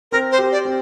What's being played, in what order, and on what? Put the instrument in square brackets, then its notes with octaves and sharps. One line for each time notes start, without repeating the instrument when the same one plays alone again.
[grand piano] C4 [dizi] A#4
[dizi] C5
[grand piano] G4
[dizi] D5
[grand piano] C4